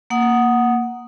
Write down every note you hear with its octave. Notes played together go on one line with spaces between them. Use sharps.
A#3 F#5 D#6